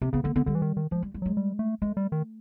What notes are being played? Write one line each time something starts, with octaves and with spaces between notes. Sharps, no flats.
C3 C4
C#3 B3
D3 A#3
D3 B3
D3 G3
E3
D#3
D#3
F3 G#3
G3
G3
F#3 G#3
G3
A3
G#3 A3
G3
D#3